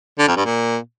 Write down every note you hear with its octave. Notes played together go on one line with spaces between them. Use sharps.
D3
F2
G2
A#2